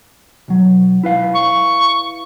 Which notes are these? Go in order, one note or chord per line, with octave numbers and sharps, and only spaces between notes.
B1 F#3
E4 B4 F5
C#6